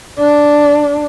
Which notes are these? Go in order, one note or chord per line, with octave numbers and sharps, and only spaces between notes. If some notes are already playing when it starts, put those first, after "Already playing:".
D4